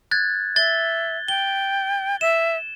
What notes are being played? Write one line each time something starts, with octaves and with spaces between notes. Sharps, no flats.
F#6 G#6 A6
E5 A6 G7
G5 G7
E5 E7